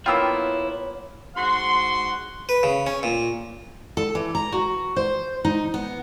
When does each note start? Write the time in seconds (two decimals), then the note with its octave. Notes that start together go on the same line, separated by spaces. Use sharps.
0.06 A#3 B3 E4 F4 C#5 G5 E6
1.36 G#2 F#4 F#5 C6
2.49 B4
2.63 C#3
2.87 C#4
3.03 A#2
3.97 A4
4.15 E3
4.35 A#5
4.52 F#4
4.96 C5
5.45 D#4
5.74 B3